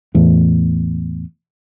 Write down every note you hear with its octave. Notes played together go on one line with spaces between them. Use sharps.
E2 A2